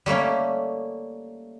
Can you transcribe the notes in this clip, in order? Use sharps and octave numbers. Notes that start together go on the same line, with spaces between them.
G3 A3 A#3 C#4